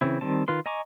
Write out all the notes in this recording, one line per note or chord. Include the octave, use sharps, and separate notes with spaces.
C#3 E3 C4 E4
D#3 G3 C4 A5
D#3 F4 B4 C6
D#5 G#5 A#5 C#6 D6